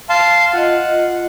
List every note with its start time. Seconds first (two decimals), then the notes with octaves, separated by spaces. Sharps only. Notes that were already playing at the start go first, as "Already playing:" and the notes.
0.10 F5 A5 C6
0.53 F4 D#5 F#5